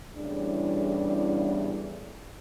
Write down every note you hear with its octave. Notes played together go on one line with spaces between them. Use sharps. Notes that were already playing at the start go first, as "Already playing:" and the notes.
E2 A2 C#3 G3 D4